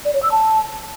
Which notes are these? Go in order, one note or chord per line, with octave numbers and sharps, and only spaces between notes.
D5
C#5
E6
A5